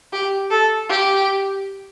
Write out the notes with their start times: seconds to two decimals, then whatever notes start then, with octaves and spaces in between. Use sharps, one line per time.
0.13 G4
0.51 A4
0.90 G4